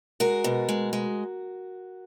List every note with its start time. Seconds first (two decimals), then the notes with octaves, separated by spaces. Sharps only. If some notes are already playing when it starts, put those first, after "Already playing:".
0.20 G#3 F#4 A#4
0.44 B2
0.69 G#3
0.93 G#3